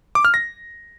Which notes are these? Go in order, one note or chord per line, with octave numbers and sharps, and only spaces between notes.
D6
F6
A#6